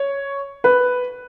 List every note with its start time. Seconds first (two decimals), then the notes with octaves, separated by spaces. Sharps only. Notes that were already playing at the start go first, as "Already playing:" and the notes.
Already playing: C#5
0.64 B4